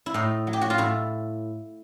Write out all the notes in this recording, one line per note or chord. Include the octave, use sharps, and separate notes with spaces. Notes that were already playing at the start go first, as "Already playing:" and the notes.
E4
A2 D#4
F#3
G4
F#4
F4
A2 E4